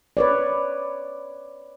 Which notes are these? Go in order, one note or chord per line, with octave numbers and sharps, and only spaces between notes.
B4 C#5 D5